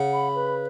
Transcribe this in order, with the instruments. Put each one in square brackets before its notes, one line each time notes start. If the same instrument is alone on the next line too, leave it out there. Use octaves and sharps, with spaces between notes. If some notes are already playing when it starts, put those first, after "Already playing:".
Already playing: [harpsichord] C#3 [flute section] F#5
[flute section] B5
B4